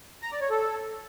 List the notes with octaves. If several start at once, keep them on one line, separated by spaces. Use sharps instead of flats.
A#5
D5
C#5
A4